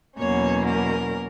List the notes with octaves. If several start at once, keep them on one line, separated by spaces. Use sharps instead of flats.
E2 B2 F#3 A#3 C#4 C#5
A#4